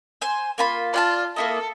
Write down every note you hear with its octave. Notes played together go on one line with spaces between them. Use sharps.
C5 G#5
A#3 F4 B5
F4 D5 G5 A5
A#3 E4 A4 D#5